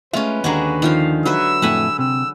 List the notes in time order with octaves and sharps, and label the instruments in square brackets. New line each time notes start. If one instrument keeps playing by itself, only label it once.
[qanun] G#3 C#4 [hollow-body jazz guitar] A3 E5 [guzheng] F4 [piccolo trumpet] B4
[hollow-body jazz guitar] D#2 A#5 [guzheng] D3 G#3 F#4 [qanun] G#5
[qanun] D#3 F3 F5
[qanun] F#3 B4 E5 [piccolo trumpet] E6
[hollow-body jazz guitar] F2 A2 A3 [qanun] F#5 G#5 B5
[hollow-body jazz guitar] C3 [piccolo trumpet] E6